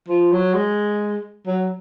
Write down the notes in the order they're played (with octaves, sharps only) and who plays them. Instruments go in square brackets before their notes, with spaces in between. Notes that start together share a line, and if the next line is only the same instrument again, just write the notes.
[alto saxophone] F3
F#3
G#3
F#3